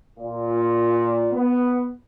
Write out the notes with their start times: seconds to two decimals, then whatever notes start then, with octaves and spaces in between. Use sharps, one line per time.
0.18 A#2
1.31 B3